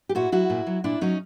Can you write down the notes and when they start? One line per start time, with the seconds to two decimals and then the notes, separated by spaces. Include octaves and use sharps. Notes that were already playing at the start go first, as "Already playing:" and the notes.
0.09 G4
0.15 A#2 E4 F#4
0.32 F#3 E4 F#4
0.50 A#2
0.67 F#3
0.84 A#2 D4 E4
1.01 F#3 C#4 D#4